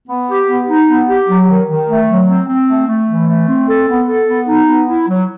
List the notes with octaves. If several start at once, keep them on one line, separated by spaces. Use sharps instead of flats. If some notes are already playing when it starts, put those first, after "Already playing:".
B3
G4
B3
D#4
B3
G4
F#3
D#3
D#3
A3
F#3
C4
C4
A3
A3
E3
A3
C4
A4
B3
A4
B3
D#4
B3
E4
F#3